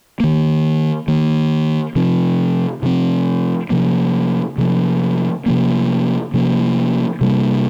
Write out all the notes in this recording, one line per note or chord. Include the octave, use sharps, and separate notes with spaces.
D#3 A#3
D#3 A#3
C3 F3 C4
C3 F3 C4
C3 F3 A#3
C3 F3 A#3
C3 F3 A#3
C3 F3 A#3
C3 G3 A#3